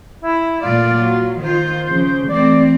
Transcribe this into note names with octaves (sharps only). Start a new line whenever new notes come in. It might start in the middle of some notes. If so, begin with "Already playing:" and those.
E4
A#2 A3 F4 D5
F#3
D#3 F4 C5
C#3 F3
E3 A3 C4 D5